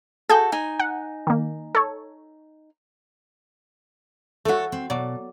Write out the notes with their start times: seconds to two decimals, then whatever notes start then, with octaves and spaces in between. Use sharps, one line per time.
0.29 F#4 G#4 A4 G6
0.52 D#4 G#5
0.79 F#5
1.27 D#3 A#3
1.75 A4 C#5
4.45 A3 F#4 A4 C#5
4.72 C4
4.90 B2 F#3 D5